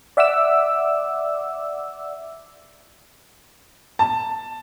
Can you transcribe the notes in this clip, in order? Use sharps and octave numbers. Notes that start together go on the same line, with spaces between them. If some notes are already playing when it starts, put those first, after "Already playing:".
D5 E5 F#5 D6 E6
A5